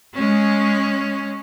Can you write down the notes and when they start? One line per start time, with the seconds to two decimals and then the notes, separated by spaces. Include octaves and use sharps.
0.14 G#3 C#4